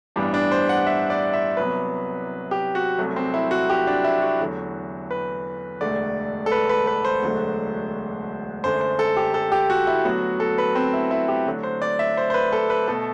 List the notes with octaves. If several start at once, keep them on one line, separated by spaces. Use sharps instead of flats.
A1 G2 E3 G3 B3 D4
D4
C5
F#5
E5
D5
E5
C2 C3 F#3 B3 B4
G4
F#4
C2 C3 F#3 A3
C4
E4
F#4
G4
D4
E4
F#4
E2 D3 F#3 A3
B4
E1 D2 D3 A3 D5
A4
B4
B4
B4
C5
E1 D2 D3 F#3 A3
F#2 D3 A3 C5
C5
A4
G4
A4
G4
F#4
E4
D2 D3 F#3 B3 F#4
A4
B4
C4
E4
E4
G4
D2 D3 F#3
C5
D5
E5
C5
C5
B4
A4
B4
B2 A3 A4